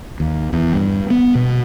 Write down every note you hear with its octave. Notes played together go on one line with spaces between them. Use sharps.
D#2
E2
G2
B3
B2